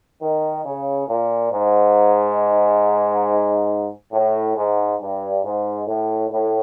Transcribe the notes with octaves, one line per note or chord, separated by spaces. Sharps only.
D#3
C#3
A#2
G#2
A2
G#2
G2
G#2
A2
A2